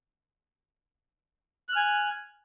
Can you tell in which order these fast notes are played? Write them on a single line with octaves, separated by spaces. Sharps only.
F#6 F6 G#5